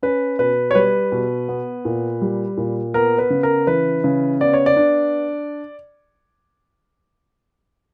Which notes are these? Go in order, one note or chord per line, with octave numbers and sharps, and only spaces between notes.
C#4 B4
B2 B4
C#5
G3 B4
B2
B3
A#2
G3
A#2
B3 A#4
B4
C#3
A#4
E3 B4
C#3
B3 D5
C#5
D5
D4